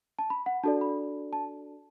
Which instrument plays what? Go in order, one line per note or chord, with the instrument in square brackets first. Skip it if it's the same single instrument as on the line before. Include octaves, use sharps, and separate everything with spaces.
[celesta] A5
B5
F#5
D4 F#4 A4 D5 A5
B5
A5